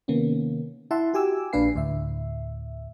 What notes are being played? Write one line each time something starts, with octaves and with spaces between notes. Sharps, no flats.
C3 D#3 A#3 B3 C#4
E4 E5 F#5 A5 C6
F#4 G4 G#5 D6 E6
A#1 A#2 D4 B4 F5 C7
D2 A2 E5